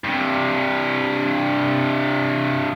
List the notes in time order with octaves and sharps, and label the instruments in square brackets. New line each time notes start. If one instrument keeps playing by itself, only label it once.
[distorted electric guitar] G2 C3